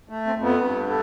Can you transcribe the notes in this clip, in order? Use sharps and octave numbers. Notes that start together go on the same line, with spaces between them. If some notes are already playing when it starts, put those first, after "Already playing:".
A3
C4
F2
B3
G2
A3